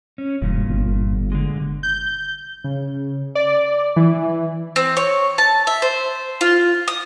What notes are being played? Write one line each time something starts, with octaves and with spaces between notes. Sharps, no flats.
C#4
E1 G2 A#2
G1
D3 G#3
G6
C#3
D5
E3
C4
C#5
A5
E5
C5
F4
D#6